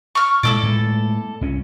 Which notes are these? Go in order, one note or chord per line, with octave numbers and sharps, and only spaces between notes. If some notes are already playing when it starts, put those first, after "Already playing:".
C#6 F6
A#2 G#3 E4 A4 D5
A2 G#3 B3
C2 C#4